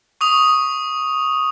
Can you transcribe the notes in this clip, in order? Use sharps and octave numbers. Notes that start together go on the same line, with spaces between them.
C#6 D#6 F7